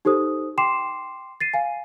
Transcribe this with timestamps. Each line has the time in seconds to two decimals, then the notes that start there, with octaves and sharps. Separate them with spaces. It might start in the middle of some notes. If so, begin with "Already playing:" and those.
0.05 D#4 G4 A4 C5 D#6
0.58 G5 C6 D6 C7 E7
1.40 A6 C7 D#7
1.54 F5 G#5